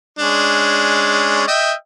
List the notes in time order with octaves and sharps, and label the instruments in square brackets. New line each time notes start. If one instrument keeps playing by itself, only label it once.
[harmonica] G#3 C#4 D4
D#5 E5 G5